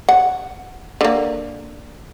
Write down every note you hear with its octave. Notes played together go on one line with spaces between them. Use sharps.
F#5
D3 A#3